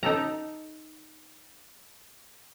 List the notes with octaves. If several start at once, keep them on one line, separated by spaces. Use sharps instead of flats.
D#4 A4 A#5